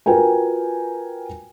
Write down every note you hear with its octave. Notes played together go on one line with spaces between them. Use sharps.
F4 F#4 A#4 B4 G5 G#5